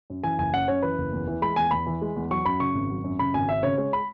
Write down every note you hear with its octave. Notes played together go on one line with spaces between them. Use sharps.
F#2
E3 G#5
F#1 G#5
C#4 F#5
F#2 C#5
E3 B4
F#1
E2
E3
G#3 B5
E2 G#5
E2 B5
E3
G#3
E2
F#3 C#6
F#2 B5
C#3 C#6
G#1
F#3
F#2
C#3 B5
G#1 G#5
C#4 E5
C#3 C#5
G#3 C#5
B5